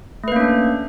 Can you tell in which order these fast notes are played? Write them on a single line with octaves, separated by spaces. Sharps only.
A3 B4 A#3 C#4 D4